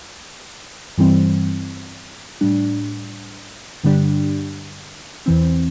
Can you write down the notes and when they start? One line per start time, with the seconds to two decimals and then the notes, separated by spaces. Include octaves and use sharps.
0.98 G2 E3 G3 C4
2.41 A2 G3 D4
3.83 G2 D3 G3 D4 G4
5.26 E2 E3 C4